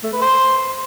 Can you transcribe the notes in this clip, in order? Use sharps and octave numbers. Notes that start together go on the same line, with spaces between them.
A3
B4
C5